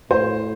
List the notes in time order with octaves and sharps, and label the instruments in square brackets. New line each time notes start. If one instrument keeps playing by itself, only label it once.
[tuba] A2 [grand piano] C5